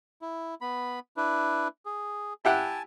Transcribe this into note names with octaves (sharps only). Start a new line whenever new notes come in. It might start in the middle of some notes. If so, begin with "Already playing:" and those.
E4
B3 B5
D4 E4 B4
G#4
E4 G4 F#5 G#5 A5